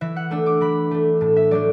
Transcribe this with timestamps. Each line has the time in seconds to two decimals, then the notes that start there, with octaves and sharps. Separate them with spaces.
0.01 E3 E5
0.16 F#5
0.31 A3 D4 E6
0.46 D6
0.61 E3 B5
0.91 A3 D4
1.21 A2 A5
1.36 E5
1.51 F#3 A3 D4 D5